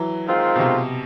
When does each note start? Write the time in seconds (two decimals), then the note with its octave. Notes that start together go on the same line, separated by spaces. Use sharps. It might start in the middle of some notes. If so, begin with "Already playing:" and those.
Already playing: E3 F#3
0.27 D#3 G#3 C4 F4
0.55 B2
0.59 C3